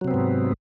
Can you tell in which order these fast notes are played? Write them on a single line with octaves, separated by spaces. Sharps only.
F#3 C3 C4 B3 G#2